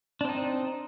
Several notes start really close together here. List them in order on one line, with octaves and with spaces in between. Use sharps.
D4 C4 D#4